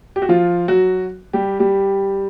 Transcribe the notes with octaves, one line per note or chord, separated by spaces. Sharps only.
G4
F#4
F3 F4
F#3 F#4
G3 G4
G3 G4